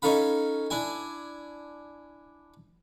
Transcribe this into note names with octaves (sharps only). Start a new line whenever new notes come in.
C#4 D#4 A4 F5 B5
D4 E4 G#5